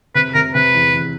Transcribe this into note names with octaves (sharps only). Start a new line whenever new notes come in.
C3 B4
C3 A#4
C3 B4
E2
E2